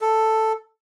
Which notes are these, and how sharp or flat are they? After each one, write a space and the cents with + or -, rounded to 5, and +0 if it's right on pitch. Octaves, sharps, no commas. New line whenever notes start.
A4 +5